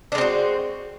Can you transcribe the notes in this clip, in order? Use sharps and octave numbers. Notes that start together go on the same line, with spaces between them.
G#3 C4 D4 F#4